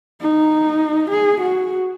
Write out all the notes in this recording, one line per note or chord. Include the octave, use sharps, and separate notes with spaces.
D#4
G#4
F#4